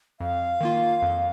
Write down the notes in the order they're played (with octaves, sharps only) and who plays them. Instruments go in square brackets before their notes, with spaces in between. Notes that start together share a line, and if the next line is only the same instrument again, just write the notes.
[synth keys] F2 [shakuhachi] F5
[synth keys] D#3 A#3 F4
F2